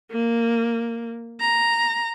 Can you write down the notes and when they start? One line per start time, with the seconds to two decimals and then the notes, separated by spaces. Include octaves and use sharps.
0.11 A#3
1.40 A#5